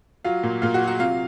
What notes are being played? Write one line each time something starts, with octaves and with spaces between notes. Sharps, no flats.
F#3 F4 F5
A#2
A#2 F4 F5
F#4 F#5
F#3
F#4 F#5
C3 F4 F5